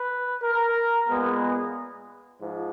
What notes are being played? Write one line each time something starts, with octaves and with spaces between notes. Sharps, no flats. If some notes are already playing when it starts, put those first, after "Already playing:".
Already playing: B4
A#4
A#2 G#3 B3
G#2 F3